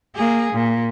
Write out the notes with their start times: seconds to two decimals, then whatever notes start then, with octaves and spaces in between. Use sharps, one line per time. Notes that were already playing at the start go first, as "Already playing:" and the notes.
0.15 A#3 G#4
0.53 A#2